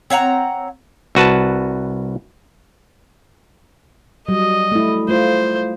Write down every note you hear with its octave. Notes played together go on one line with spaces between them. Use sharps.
C4 C#5 F#5 A#5
C2 F#4 B4 A5
F#3 G3 D#5
A3 E4
A3 F4 C5